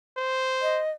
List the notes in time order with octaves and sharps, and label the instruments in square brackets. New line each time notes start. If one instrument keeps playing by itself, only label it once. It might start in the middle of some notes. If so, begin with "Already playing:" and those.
[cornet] C5
[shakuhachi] D#5